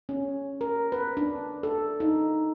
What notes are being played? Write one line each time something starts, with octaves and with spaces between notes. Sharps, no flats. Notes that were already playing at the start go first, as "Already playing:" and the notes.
C#4
A#4
B4
D4
A4
D#4